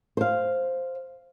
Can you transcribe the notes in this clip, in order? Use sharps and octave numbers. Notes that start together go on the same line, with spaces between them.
C5 F5